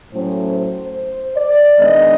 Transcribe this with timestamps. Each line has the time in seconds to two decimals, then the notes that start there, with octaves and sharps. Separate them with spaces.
0.12 A2 F#3 A3 C#4 C5
0.54 C5
1.36 D5
1.78 D#3 G#3 B3 D4 D#5